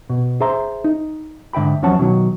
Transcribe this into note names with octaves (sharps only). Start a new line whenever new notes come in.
B2
G#4 C5 E5 A#5 C6
D#4
G#2 D3 E5 G5 B5
E2 F3 F#3 C#4 F#5 A5
B2 D#3 F#3